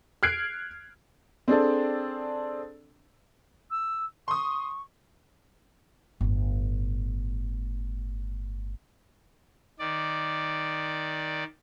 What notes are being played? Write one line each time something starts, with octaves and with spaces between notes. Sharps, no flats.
F6 F#6 G#6 C7 D7
C4 D4 G#4 A4 D5
E6
C6 C#6 D#6
G1 A2
D#3 D5